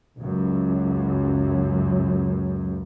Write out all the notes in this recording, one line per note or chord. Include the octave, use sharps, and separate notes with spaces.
C#2 F#2